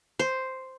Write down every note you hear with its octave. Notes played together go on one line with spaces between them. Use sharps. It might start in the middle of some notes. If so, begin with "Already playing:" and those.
C5